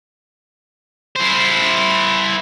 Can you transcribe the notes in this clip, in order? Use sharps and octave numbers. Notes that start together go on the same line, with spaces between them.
E4 C5